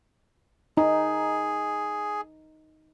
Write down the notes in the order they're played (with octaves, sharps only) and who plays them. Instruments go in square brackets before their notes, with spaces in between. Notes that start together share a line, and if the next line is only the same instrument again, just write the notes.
[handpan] D#4 [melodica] G#4